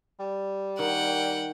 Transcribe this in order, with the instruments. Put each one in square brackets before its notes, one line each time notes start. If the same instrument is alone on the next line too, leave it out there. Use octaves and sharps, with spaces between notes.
[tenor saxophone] G3
[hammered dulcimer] D#3 [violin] F#5 G5